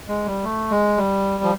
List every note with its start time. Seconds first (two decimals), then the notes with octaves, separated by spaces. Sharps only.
0.08 G#3
0.26 G3
0.44 A3
0.71 G#3
0.97 G3
1.43 F3